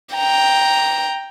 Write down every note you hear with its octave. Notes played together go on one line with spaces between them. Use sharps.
G5 A#5